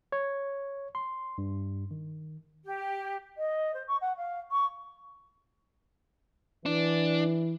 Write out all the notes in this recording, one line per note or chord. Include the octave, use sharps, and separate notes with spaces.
C#5
C6
G2
D#3
G4
D#5
C5
C#6
F#5
F5
C#6
E3 D4